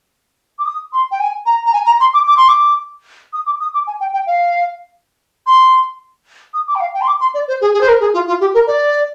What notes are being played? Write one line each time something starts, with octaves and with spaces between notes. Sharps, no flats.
D6
D#6
C6
G5
G#5
A#5
A#5
G#5
A#5
C6
D6
D6
C6
D6
D#6
D6
D#6
D6
G#5
G5
G5
F5
C6
D#6
D6
G5
F5
G5
C6
D6
C6
D5
C5
G#4
G#4
C5
A#4
G#4
F4
F4
G4
A#4
D5